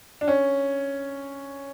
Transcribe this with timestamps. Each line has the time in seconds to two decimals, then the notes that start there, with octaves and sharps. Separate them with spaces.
0.21 D4
0.28 C#4